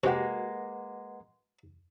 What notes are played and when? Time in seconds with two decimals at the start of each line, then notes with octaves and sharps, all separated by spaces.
0.04 C3 G#3 A#3 F#4 G4 B4 D#5 F#5